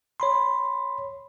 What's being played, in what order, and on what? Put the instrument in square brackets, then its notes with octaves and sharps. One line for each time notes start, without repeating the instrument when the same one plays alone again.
[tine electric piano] C#5 B5 C6